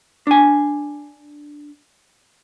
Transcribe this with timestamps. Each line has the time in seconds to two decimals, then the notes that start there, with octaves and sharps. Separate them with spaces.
0.27 D4 G#5